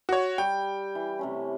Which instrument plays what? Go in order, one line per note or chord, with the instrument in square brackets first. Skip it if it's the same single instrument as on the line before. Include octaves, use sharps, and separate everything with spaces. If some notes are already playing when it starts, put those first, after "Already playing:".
[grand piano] F#4 C#5
[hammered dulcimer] G3 [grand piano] G5
[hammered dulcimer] E3
C3 A3 C#4